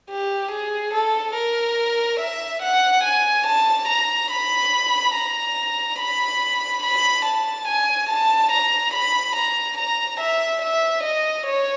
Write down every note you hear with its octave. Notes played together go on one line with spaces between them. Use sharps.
G4
G#4
A4
A#4
E5
F#5
G#5
A5
A#5
B5
A#5
B5
B5
A5
G#5
A5
A#5
B5
A#5
A#5
E5
E5
D#5
C#5